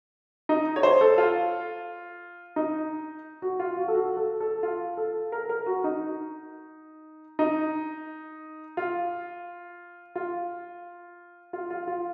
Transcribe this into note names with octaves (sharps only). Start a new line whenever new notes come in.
D#4
C#5
C5
A4
F4
D#4
F#4
F4
F#4
A4
F#4
A4
A4
F4
A4
A#4
A#4
F#4
D#4
D#4
F4
F4
F4
F4
F4